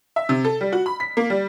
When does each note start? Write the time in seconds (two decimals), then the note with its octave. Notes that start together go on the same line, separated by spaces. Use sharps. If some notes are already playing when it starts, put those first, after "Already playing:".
0.16 E5
0.29 C3
0.45 A4
0.61 G3
0.72 F#4
0.86 B5
1.00 B6
1.17 A#3
1.30 G3